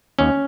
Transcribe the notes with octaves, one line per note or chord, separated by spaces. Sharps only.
D#2 C#4